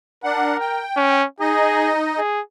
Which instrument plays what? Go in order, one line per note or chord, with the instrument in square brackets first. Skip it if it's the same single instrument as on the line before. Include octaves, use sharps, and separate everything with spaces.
[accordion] D4 F#5 [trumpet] A#4
[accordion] G5
[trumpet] C#4
[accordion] D#4 D#5 [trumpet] G#4
[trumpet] G#4